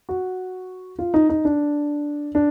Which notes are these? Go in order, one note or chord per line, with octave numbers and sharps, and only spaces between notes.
F#4
F4
D#4
D#4
D4
D4